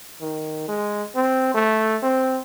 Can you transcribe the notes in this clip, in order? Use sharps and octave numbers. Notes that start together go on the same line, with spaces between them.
D#3
G#3
C4
A3
C4